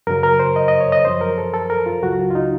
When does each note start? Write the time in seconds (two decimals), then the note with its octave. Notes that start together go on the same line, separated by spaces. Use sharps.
0.07 F#2 C#3 F#3 A#4
0.23 A#4
0.40 C5
0.56 D#5
0.68 D#5
0.80 C#5
0.92 D#5
1.05 F#2 F3 C5
1.21 A#4
1.38 A4
1.53 A4
1.70 A#4
1.86 F4
2.03 C#2 C#3 F#3 F#4
2.19 F4
2.31 F4
2.35 D#4